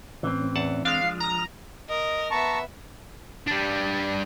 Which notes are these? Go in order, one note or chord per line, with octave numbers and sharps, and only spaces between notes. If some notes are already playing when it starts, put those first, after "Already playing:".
A2 E3 C4 C#4
E2 F#5 A5
G#3 D4 F5
F3 D#6 F6
A#5
A#4 D#5
B3 E5 A5 A#5 C#6
G3 D4